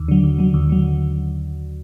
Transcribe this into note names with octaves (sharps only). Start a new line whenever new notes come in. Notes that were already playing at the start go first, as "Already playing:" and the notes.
Already playing: D#2
D3 F#3
D#2
D3 F#3
D#2
D3 F#3